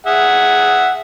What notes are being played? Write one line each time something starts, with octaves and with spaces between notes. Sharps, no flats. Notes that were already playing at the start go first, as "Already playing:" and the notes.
G#4 E5 F#5